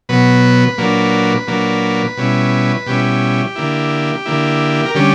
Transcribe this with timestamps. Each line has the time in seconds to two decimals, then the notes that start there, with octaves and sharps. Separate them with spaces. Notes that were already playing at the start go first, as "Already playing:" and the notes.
0.09 B2 F#3 B3 B4
0.78 A#2 F#3 A#3 D4
1.47 A#2 F#3 A#3 D4
2.17 B2 G3 C#4 E4
2.86 B2 G3 C#4 E4 G4
3.56 D3 A#3 E4
4.26 D3 A#3 E4
4.86 A#4
4.95 D3 G3 C#4 G4